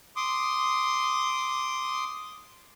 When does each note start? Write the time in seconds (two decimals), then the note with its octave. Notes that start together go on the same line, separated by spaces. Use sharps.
0.16 C6 D6 D#6